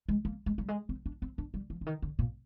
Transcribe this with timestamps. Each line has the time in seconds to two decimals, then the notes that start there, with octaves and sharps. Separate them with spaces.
0.09 G#3
0.25 A#3
0.46 G#3
0.58 G3
0.68 G#3
0.89 C4
1.06 D4
1.22 C4
1.38 D4
1.54 G3
1.70 F3
1.81 D3
1.86 D#3
2.02 D3
2.19 A#2